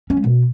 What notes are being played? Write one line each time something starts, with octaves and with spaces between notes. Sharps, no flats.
C#4
G#3
B2